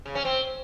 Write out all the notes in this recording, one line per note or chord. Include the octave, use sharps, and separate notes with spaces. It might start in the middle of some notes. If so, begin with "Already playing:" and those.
C#3
C#4
C4